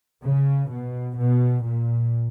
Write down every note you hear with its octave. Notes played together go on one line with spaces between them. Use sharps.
C#3
B2
B2
A#2